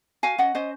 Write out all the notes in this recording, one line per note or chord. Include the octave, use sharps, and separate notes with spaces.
F#4 F5 G#5
C#4 D#5 F#5
C#4 C5 D#5